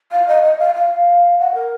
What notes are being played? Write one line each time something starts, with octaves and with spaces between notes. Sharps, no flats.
F5
D#5
D#5
F5
F5
F#5
A#4